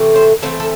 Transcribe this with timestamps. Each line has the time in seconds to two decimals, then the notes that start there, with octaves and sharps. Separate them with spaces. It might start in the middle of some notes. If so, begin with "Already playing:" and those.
Already playing: C3 E3 A3
0.16 C5
0.42 E3 A3 C4 A4
0.60 A4